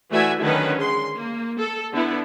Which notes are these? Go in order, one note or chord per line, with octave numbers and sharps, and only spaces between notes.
E3 A3 F#4 D5 E5 G#5
D3 D#3 F#3 C#4 D#4 B4
G#3 C6
A#3
A4
D3 B3 E4